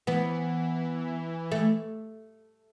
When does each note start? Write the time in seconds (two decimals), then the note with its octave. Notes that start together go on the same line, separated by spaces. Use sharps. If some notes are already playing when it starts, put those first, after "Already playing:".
0.07 E3 B3
1.52 A3